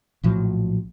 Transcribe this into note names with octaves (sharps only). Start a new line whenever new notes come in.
A#1 A2 F3 F#3